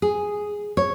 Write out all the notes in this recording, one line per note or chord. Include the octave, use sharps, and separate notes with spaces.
G#4
C#5